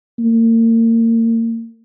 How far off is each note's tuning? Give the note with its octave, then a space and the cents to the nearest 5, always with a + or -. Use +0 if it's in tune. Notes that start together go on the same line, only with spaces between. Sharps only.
A#3 -35